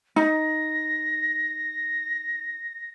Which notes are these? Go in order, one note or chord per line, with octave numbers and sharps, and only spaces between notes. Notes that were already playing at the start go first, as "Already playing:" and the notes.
D#4 A#6